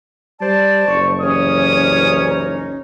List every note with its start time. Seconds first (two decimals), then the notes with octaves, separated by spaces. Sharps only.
0.41 G3 C5 D5 A5
0.88 F#1 C#6
1.22 C2 E3 C#4 D#6
2.26 D#4